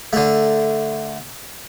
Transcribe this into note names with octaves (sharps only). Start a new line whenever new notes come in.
D3 A3